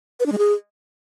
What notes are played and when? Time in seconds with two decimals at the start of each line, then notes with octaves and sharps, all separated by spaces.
0.20 B4
0.26 D4
0.32 G#3
0.38 G#4